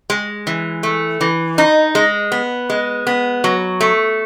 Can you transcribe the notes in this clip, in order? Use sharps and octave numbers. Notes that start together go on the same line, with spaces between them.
G#3
E3
A3
E3
D#4
G#3
B3
G#3
B3
F#3
A3